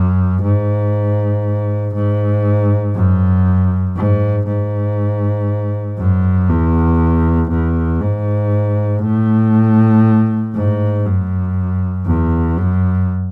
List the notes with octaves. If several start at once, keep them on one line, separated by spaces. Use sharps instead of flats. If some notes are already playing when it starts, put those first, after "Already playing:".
Already playing: F#2
G#2
G#2
F#2
G#2
G#2
F#2
E2
E2
G#2
A2
G#2
F#2
E2
F#2